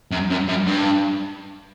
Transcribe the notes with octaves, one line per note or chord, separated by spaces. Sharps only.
F#2
F#2
F#2
G2